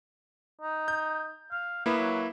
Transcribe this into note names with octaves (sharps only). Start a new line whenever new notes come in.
D#4
G6
F5
A#3 B3 E4 B4
F#3